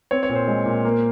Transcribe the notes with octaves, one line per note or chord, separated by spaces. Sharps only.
C4 C#5
C#5
A#2
C5
G#3
A#2
A#3